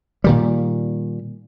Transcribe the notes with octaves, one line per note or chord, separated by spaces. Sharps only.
A#2 D#3 G3